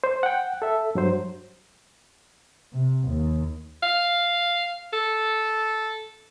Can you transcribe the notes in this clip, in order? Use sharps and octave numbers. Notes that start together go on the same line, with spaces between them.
C5
F#5 G5
A4 E5
G2 F#3 C5
C3
D#2
F5
A4